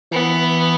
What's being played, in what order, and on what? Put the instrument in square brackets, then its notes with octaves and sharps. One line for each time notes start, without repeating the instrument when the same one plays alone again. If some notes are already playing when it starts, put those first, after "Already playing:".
[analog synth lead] E3 [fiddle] B3